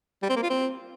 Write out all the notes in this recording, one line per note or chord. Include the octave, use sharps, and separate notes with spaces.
G3
C4
A#3
F4
C4